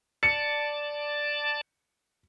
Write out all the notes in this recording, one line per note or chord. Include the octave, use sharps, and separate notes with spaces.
D5 A5 C#7